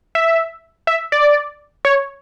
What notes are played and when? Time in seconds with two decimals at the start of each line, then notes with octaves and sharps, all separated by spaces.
0.15 E5
0.87 E5
1.12 D5
1.85 C#5